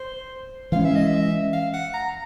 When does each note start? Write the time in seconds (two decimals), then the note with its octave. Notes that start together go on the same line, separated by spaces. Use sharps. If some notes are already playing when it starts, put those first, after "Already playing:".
Already playing: C5
0.72 E3 G#3 C#4 F5
0.85 E5
0.96 D#5
1.08 E5
1.53 F5
1.74 F#5
1.94 A#5